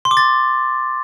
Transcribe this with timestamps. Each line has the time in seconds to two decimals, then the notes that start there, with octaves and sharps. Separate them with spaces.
0.05 C6
0.11 D6
0.17 A6